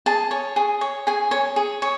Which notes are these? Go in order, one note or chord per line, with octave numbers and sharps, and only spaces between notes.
G#4 A5
C#5
G#4
C#5
G#4 G#5
C#5
G#4
C#5